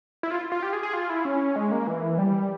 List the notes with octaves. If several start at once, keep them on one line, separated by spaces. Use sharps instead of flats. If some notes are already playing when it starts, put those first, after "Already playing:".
E4
F4
F4
G4
G#4
G#4
F4
E4
C#4
G#3
A#3
E3
G3